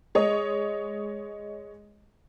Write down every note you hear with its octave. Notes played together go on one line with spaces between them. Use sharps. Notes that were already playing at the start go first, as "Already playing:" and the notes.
G#3 C#5 D#5 D#6